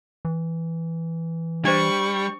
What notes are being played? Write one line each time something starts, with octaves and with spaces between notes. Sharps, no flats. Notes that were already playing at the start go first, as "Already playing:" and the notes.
E3
G3 D4 C5 C#6